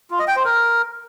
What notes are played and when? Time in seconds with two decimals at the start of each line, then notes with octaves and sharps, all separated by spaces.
0.11 F4
0.19 D#5
0.28 G5
0.36 C5
0.45 A#4